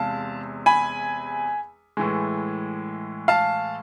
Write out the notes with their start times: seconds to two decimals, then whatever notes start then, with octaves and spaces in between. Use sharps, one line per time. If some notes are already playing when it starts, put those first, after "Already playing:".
Already playing: E2 C3 G#3 F5 A5
0.66 G#5 B5
1.97 A2 E3 G#3
3.28 F5 A5